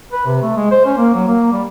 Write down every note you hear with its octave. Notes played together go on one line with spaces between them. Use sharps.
B4
C3
A3
G#3
C5
C#4
A#3
F#3
A#3
G3